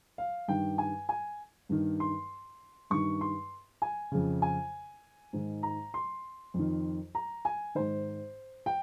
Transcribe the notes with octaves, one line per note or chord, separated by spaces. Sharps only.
F5
G2 D#3 G5
G#5
G#5
G2 D#3
C6
G2 D#3 C#6
C6
G#5
F2 C#3
G#5
G#2 D#3
A#5
C6
F2 D#3
A#5
G#5
G#2 D#3 C5
G5